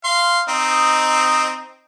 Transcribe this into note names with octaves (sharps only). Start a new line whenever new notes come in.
F5 C6
C4 D#4 D#5